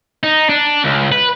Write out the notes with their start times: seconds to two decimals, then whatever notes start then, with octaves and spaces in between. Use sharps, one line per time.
0.23 D#4
0.49 D4
0.84 C#2
1.12 B4